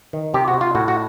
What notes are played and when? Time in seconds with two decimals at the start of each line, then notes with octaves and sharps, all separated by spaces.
0.13 D#3
0.34 C3 G4
0.48 F#4
0.54 C3
0.61 F4
0.75 A2 F#4
0.88 F#4